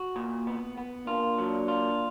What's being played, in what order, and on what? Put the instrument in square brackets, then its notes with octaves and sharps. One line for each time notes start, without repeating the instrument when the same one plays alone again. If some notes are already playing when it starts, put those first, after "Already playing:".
Already playing: [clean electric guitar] F#4
A#2
B3
B3
[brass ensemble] A#3 D4 [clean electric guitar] F4
[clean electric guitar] F#3
F4